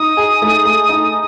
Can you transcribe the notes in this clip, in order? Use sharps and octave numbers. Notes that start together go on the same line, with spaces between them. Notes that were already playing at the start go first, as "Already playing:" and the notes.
Already playing: D#4 D#6
G#4
A3
A3
D#4